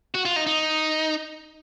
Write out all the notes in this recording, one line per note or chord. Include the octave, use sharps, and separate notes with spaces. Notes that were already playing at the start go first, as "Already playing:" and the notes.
F#4
F4
D#4
D#4